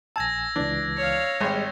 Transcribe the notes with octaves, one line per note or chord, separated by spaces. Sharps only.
A#1 G#5 A5 E6 G#6 A#6
C#2 E3 D4
C#5 F5
G#1 G3 G#3 G4 G#6